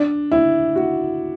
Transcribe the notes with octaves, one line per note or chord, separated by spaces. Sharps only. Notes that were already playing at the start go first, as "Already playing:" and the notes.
Already playing: D4
E4
F#4